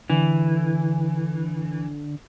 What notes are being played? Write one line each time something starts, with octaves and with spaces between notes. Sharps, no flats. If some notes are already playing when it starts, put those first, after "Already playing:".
D3 E3